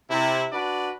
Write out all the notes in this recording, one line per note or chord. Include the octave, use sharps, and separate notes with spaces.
C3 E4
D4 F#4 B4 D5